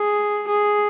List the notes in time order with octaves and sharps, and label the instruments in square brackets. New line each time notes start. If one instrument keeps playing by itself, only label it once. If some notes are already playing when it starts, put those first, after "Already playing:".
Already playing: [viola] G#4
G#4